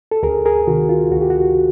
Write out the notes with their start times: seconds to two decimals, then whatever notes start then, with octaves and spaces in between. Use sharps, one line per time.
0.11 A4
0.23 D2 G#4 A#4
0.46 G#4 A#4
0.67 C3 D#3 F#4
0.89 F4
1.12 D2 F#4
1.21 G4
1.30 F#4